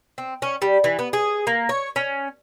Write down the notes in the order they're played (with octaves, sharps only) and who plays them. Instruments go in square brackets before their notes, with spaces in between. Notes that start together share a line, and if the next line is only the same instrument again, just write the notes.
[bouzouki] C4
C#4
G3
E3
B3
G#4
A#3
C#5
C#4